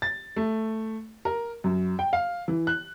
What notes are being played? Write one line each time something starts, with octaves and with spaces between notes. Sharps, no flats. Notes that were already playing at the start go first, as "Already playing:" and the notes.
A6
A3
A#4
F#2
G5
F5
E3
F#6